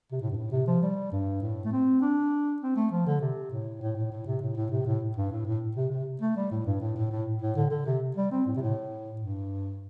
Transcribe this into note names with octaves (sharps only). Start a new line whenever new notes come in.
C3
A2
G2
A2
C3
F3
G3
G2
A2
A3
C4
D4
C4
A3
F3
D3
C3
A2
A2
A2
A2
C3
A2
A2
C3
A2
G2
A2
A2
C3
C3
A3
G3
A2
G2
A2
A2
A2
A2
D3
D3
C3
G3
C4
A2
C3
A2
G2